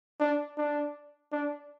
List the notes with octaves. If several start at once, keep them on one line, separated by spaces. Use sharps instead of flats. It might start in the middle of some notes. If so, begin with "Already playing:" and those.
D4
D4
D4